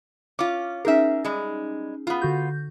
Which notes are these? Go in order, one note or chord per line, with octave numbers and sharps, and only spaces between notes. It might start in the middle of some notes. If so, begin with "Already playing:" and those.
C#4 F4 D6
C#4 D#4 G#4 A#4 E5
G3 G#3
B3 F4
D3 F#4 G6